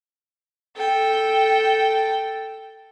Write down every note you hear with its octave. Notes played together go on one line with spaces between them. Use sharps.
A4 G5